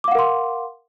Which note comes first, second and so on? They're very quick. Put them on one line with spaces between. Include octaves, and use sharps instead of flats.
D6 F5 F#5 A#4 C6